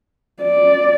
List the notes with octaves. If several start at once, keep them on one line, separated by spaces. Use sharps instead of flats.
D5